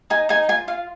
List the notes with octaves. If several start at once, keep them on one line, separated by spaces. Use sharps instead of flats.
D#4 G#5
D#4 G#5
F4 G#5
F4 F5